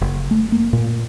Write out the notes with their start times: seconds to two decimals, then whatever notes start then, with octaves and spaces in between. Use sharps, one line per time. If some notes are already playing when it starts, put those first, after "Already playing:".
0.01 F#1
0.31 A3
0.52 A#3
0.73 A#2